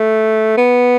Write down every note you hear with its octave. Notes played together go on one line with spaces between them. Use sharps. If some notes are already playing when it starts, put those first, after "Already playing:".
Already playing: A3
B3